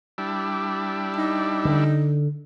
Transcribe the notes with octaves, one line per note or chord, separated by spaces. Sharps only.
G3 D4 E4
D#4
D3